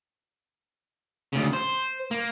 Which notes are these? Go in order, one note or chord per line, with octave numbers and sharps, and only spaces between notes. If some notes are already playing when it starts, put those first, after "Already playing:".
D2 C#3
C5
A#3